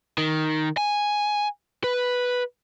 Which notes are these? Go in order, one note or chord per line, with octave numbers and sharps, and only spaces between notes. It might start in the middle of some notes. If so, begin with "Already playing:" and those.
D#3
G#5
B4